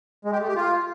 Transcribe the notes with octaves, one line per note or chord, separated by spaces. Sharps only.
G#3
G4
A3
G4
F4